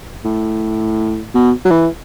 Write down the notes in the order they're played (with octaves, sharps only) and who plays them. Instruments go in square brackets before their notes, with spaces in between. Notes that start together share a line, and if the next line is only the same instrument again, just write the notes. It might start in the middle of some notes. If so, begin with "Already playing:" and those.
[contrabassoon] A2
B2
F#3
E3